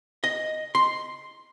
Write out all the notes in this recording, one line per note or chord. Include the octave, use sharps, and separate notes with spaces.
D#5
C6